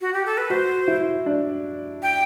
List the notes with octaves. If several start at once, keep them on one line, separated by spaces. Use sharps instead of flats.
F#4
G4
A4
B4
F#4 C5
E4
D4
G5